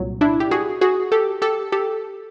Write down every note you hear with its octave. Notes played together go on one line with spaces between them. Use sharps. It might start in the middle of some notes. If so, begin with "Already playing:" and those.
Already playing: C2 A#2 F#3
D4 E4
G4
F#4 G#4
F#4 G#4
G4 A4
G4 A4
G4 A4